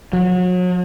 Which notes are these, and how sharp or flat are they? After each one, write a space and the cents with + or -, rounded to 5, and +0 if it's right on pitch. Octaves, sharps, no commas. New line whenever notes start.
F#3 -35